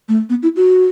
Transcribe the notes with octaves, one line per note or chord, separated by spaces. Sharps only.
A3
B3
E4
F#4